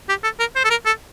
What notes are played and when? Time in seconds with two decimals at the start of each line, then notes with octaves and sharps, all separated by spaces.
0.09 G4
0.24 A4
0.40 A#4
0.55 C5
0.65 A4
0.70 A#4
0.86 A4